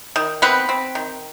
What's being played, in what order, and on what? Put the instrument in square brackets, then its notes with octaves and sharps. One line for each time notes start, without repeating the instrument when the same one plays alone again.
[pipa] D#3
B3 C4 B4
C4
D#3